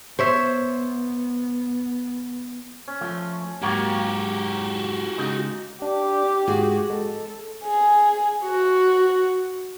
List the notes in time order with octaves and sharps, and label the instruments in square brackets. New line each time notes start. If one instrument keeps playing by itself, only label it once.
[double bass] B3 [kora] C5 C#5 E5
[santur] C#4
[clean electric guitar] F3 A3
[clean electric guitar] G#2 F#3 [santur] A#3 C#6 [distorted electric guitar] F#4 G4
[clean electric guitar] C#3 G#3 D#4
[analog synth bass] D4 [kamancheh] G4
[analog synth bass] G#2 [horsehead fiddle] F#4 [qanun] G#4
[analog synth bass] G#3 [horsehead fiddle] A4
[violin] G#4
F#4